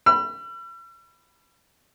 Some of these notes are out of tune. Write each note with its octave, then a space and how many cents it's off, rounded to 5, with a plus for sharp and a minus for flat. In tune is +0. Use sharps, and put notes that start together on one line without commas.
B5 +0 E6 +45